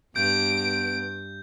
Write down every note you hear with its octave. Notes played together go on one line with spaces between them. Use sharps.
G2 B3 G6 D7